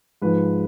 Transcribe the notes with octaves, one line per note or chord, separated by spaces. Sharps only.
G#2 F3 B4